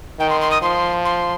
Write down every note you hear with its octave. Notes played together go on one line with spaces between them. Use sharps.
D#3 G5
C6
C6
D#6
F3 C6
C6